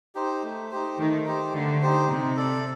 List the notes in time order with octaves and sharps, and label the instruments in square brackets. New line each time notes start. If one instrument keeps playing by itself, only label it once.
[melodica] D#4 G4 C5
A3
D#4 G4 C5
[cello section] D#3 [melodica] A3
[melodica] D#4 G4 C5
[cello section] D3 [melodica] A3
[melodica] D#4 G4 C5
[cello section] C3 [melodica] D#4
[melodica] A4 D5